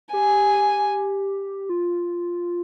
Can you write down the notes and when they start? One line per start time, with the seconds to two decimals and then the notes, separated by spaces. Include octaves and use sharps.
0.13 G4 G#5
1.69 F4